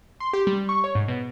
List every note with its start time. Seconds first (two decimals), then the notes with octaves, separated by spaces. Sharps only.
0.20 C6
0.33 G4
0.47 G3
0.69 C#6
0.84 C#5
0.95 G#2
1.08 B2